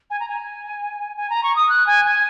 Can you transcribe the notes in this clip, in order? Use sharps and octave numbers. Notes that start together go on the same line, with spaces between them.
G#5
A#5
G#5
G#5
A#5
C#6
D#6
F#6
G#5
G#5